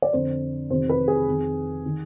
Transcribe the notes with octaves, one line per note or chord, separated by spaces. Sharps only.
D5
F2 D3 C5
F2 C3 D#3 C5
B4
G#4
F2 D#3
D#3